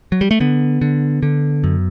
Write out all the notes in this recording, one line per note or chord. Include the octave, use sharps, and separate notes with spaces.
F#3
G3
A3
D3 B3
D3
D3
F#2